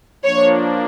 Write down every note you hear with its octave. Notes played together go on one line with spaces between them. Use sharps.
F3 A#3 D4 C#5